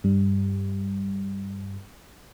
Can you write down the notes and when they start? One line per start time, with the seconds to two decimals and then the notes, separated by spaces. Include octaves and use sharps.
0.04 G2 G3